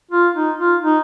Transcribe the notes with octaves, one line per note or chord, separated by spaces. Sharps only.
F4
D#4
F4
D#4